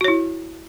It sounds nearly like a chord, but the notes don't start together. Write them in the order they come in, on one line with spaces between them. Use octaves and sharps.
F#4 C#5 E4